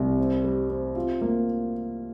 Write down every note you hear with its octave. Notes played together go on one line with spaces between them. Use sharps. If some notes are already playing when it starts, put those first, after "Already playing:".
Already playing: C2
C4
G3
C4
F4
A#3